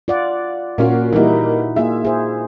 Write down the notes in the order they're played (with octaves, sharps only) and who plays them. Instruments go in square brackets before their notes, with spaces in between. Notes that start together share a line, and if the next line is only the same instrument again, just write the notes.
[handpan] F4 D5 F#5
[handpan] A#2 F#4 [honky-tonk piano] A#3 C#4 F4
[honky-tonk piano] E3 G3 A#3 [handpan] D#4 E4
[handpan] A#3 F4 G#4 [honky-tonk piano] E5
[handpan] G#4 C5